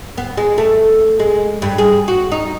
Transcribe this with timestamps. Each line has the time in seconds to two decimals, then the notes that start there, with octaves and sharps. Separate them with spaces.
0.18 B3
0.37 G#3
0.58 A3
1.20 G#3
1.62 G2
1.78 G#4
2.08 F#4
2.32 D#4